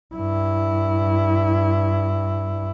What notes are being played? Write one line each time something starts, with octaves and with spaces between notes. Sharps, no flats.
G2 E4